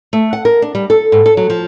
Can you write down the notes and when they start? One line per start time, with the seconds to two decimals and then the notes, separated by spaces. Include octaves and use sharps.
0.13 A3
0.33 F#5
0.45 A#4
0.62 D4
0.75 G3
0.90 A4
1.12 G#2
1.26 A4
1.37 F#3
1.50 F3